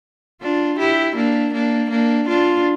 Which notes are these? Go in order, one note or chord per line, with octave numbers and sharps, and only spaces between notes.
D4 F4
E4 G4
A#3 D4
A#3 D4
A#3 D4
D4 F4